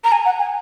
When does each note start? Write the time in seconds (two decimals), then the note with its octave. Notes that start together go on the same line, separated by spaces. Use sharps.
0.04 A#5
0.12 G#5
0.25 F#5
0.39 G#5